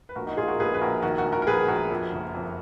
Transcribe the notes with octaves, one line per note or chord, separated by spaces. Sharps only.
B4
A#1 F#4 A#4
D#4 F#4
A#1 F4 G#4
F#4 A#4
A#1 G#4 B4
B4
A#1 F#4 A#4
D#3 F#4 A#4
F#4 A#4
A#1
F#4 A#4
A#4
A#1 G#4 B4
A#1 F#4 A#4
F2
F#1
F2